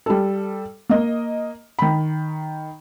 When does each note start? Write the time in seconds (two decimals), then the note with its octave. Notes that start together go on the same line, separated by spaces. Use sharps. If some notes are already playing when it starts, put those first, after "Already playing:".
0.06 G3 A4
0.89 A#3 D#5
1.79 D#3 B5